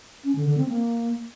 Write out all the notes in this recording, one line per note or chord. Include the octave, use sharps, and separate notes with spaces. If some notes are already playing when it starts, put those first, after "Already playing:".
C#4
D3
D3
C4
A#3